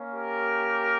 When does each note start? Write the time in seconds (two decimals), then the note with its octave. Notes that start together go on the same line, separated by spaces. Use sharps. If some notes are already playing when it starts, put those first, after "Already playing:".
Already playing: A#3 C#4
0.13 G4 A#4